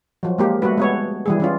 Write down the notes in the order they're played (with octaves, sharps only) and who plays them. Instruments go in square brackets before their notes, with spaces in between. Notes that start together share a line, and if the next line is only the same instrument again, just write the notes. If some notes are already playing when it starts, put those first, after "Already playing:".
[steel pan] F3 F#3
G#3 A#3 G4
G3 A3 F#4 B4
G#3 B3 C#5
E3 G3 G#4
E3 C#4 F4